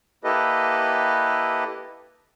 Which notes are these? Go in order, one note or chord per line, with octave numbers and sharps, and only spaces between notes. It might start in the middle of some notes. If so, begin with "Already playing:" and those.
A#3 E4 G4 A4 B4 D#5